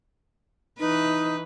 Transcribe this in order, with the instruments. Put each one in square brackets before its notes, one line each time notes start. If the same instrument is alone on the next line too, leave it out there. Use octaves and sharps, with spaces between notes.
[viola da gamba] E3 B4 [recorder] D#4